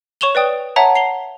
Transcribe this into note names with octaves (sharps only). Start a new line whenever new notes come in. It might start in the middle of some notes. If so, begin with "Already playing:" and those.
C#5 C#6 E7 F7 G7
B4 D5 G5 D#6
C#5 E5 F#5 A5 A#5
C7 F7 G7